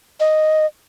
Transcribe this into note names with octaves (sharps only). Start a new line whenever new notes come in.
D#5